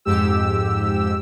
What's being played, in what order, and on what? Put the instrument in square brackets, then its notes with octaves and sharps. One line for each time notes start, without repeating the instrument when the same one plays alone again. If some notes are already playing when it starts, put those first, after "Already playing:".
[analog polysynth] F2 G#2 G4 E6